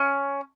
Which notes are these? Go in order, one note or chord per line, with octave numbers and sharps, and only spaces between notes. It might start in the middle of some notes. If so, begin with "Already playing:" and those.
Already playing: C#4